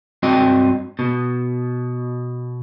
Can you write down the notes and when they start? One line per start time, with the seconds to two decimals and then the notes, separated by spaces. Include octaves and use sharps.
0.23 G2 C4 F#4 D#5 G5
0.99 B2